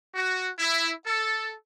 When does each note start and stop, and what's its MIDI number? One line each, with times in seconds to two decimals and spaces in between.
0.15 0.48 66
0.59 0.91 64
1.06 1.53 69